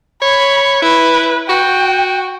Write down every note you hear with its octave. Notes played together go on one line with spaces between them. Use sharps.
C#5 B5
E4 B4
F#4 G5